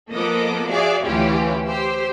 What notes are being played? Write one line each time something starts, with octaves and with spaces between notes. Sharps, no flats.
F3 A#3 B3 A4 D#5 D6
F#4 G#4 D5 E5 F5
D2 E3 C#4 E4 F4 G4
G4 C5 C6 E6